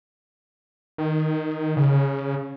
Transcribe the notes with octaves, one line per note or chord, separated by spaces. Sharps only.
D#3
C#3